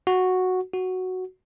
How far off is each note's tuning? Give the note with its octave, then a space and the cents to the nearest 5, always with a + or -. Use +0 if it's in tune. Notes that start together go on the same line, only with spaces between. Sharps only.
F#4 -5
F#4 +0